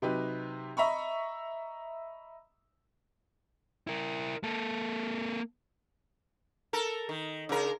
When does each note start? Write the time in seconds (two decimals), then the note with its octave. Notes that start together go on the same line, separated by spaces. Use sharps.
0.02 C3 F#3 D#4 G4 B4
0.77 D#5 E5 A#5 B5 C#6
3.87 E4 A#4
4.43 A#3 A4
6.73 A4 A#4
7.09 D#3
7.49 C#3 A#4